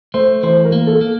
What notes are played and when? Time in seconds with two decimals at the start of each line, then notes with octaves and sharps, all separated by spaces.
0.14 A3 C5
0.43 E3 C5
0.65 A#4
0.72 A#3
0.87 A4
1.01 A#3